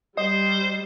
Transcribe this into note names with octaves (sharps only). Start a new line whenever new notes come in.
G3 C5 D#5